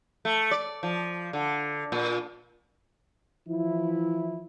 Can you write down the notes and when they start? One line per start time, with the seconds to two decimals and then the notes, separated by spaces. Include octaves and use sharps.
0.25 A3
0.51 D5
0.83 F3
1.33 D3
1.92 A#2
3.49 E3 F3 E4